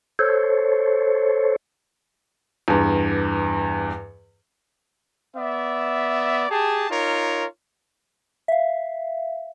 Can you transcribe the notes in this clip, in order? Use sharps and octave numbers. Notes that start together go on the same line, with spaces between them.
A4 C5 C#5
E2 G2
B3 D5 E5
G4 G#4 A5
D#4 F4 A#4 C#5
E5 F5